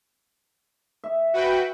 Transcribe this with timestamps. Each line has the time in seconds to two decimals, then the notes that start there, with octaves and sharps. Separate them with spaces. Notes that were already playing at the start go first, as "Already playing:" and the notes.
1.04 E5
1.34 F#4 B4 G5